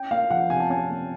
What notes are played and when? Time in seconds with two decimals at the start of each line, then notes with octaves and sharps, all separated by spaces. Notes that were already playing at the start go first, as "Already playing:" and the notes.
Already playing: C#4 G5
0.11 A#3 F5
0.30 F3 F#5
0.50 C3 G#5
0.60 A5
0.70 C#4 G#5
0.90 A#3